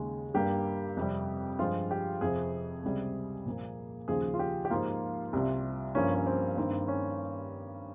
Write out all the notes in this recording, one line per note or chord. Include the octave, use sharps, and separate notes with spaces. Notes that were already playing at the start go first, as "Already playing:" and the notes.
Already playing: D#2 C#3 G#3
G2 G3 A#3 G4
F2 C3 G3
G2 F3 G#3 F4
G4
F2 C3 F3 G#4
C#2 C3 G3
A#2 F3 A#3
D#2 C#3 F3 G#4
F4
G4
G4
G#2 F3 A#3 F4
C2 C3 G3
G2 F3 A#3 C#4
C#4
C4
G2 D#3 A#3 C4
C#4